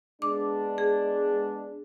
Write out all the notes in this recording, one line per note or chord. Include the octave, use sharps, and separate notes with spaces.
G#3 B3 D4 D6
G#4